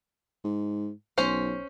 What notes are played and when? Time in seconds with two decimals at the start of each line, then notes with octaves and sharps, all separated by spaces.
0.44 G#2
1.18 B1 C#4 C5